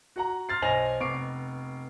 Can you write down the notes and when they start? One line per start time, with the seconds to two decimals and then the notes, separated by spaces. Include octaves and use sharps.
0.16 F#4 F#5 A#5
0.49 C6 F6 A6 C7
0.62 B1 C5 D#5 G#5 A#6 F7
1.00 F1 B3 C#6 D6 C7 D7